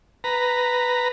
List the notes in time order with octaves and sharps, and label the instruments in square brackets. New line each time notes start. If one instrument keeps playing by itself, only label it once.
[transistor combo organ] B4 A#5